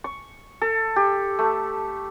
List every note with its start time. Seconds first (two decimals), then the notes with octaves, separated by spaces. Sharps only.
0.04 C#6
0.62 A4
0.96 G4
1.39 A3